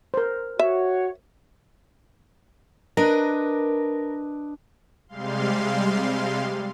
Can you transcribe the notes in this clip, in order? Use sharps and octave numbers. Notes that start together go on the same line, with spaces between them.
A#4 C5
F#4 C#5 E5
D4 A#4 B4 D#5
C3 G3 G#3 F5 C6